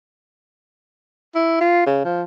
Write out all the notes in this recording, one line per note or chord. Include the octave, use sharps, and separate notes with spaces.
E4
F4
C#3
F3